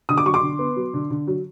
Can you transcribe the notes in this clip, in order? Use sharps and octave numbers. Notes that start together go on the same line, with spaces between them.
D3 D#6
D6
F#3 C#6
C6 D6
D3
B3
F#3
D3
D3
F#3